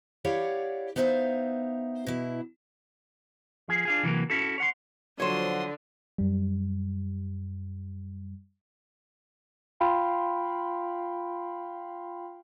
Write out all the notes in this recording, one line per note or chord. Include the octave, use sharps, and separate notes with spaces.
E4 G4 C#5 D5 F5 F#5
B3 D#4 B4 C5 E5 F5
B2 E4
F3 G#4
D4 F4 G#4
C3 E3 F#3 A#3
C#4 E4 F#4 A4
C#5 F#5 C6
D3 F3 F#3 C5 C#5 C6 D#6
F#2 G3
F4 F5 G5 B5 C6